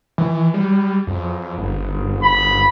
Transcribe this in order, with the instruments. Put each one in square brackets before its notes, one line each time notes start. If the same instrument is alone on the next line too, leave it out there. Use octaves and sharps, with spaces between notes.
[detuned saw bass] E3
G3
F2
G1
[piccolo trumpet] B5